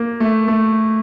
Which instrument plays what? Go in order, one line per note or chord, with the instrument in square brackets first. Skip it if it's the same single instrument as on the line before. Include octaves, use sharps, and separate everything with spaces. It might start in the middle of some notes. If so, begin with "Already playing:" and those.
Already playing: [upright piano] A#3
A3
A3